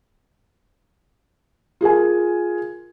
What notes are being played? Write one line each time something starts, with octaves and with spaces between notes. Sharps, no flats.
F4 G#4 A#4 G#5